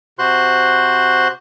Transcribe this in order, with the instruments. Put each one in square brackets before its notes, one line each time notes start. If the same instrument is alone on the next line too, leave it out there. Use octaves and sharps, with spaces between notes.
[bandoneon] C3 F#4 C5 C6 F#6